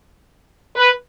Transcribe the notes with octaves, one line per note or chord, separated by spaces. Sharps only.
B4